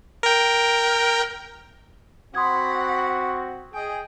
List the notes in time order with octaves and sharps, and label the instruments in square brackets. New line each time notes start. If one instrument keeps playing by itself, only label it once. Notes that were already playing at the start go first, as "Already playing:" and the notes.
[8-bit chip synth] A#4 G5
[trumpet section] C4 F#4 [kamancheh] F#5 B5 [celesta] C6 D#6 G#6
[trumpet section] G#4 [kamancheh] D#5 G5